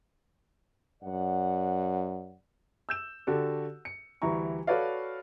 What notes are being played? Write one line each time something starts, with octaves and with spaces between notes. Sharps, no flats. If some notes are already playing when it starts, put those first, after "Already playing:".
F#2 D5 F#5
E6 G6 E7
D3 F#4 G4 A4
C#7
D2 E3 G3 E4 A#5 C#6
F#4 A4 B4 C#5 D5 F5